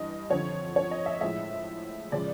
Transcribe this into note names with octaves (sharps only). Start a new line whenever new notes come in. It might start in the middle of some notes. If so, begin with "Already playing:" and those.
Already playing: G2 E3 D#5
F2 D3 F3 C#5
C#5
D#5
E5
A2 F3 G#3 E5
C#3 F3 G#3 D5